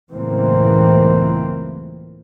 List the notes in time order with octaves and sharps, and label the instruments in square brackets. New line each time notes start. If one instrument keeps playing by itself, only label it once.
[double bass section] C#2 F#2 A2 E3 A#3 C4